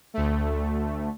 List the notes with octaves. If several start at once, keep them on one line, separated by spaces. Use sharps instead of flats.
D2 A3